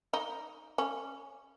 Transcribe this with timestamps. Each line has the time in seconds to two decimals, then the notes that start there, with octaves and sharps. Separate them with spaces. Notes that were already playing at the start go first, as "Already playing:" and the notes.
0.13 D#4
0.78 C#4